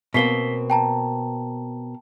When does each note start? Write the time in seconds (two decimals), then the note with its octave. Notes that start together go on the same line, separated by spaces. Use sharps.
0.14 B2 A#3 C4 B6 C7 G7
0.70 G5 A5 A#5